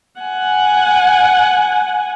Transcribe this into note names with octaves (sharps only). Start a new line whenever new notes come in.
F#5 G#5